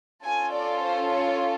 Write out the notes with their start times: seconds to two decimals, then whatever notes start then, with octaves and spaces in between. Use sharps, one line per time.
0.24 C#4 F4 A4 G#5
0.54 D5
0.82 C5
1.11 C#5